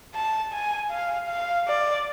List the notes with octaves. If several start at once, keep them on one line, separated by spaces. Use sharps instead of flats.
A5
G#5
F5
F5
D5